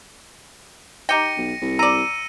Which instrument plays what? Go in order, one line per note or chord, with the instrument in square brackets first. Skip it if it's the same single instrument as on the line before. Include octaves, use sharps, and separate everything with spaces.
[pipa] D#4 G4 G5 [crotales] A#6 C#7 D#7
[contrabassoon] B1
C2
[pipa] D5 A#5 [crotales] E6 D#7